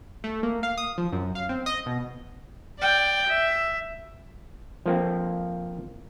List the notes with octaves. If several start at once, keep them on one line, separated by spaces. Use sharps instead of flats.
A3
A#3
F5
D#6
F3
F#2
F5
C4
D#5
B2
D5 G5
E5
F3 A#3 C4